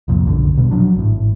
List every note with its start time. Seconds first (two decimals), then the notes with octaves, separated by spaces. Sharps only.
0.08 C2 F2 A#2
0.26 F1 B1 F#2 D3
0.55 D#1 B2 G3
0.71 F3 F#3 D4
0.96 G#1 A2